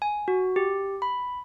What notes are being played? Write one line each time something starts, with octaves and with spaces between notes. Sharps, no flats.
G#5
F#4
G4
B5